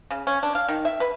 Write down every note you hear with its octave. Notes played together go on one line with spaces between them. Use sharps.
C#3
C#4
D4
F5
D#3
E5
B4